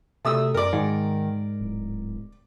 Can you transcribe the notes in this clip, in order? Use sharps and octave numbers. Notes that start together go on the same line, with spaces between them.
C3 A3 D#6 E6
F#2 A#4 D5
G#2 D#3
D1